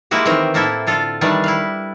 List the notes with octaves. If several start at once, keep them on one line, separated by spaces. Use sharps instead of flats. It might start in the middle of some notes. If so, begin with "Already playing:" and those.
G#3 A#3 E4 F#4 G4
D#3 E3 C4 A#4
A2 A#3 E4 A4 E5
D3 F4 A4
D#3 E3 G3 D4
E4 B4 F5